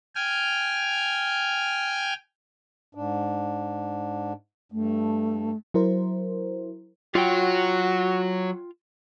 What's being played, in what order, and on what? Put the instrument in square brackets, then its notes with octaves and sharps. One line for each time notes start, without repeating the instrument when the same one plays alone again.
[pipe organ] G5 G#5 F6
[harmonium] G#2 D4
[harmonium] G2 [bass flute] A3
[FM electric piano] F#3 E4 A#4 C5
[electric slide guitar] F#3 [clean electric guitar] F4 G5 [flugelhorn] F#4